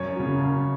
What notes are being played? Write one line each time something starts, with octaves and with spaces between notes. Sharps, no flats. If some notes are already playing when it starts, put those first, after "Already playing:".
Already playing: F#2 C#5
C#3 F#3
F#2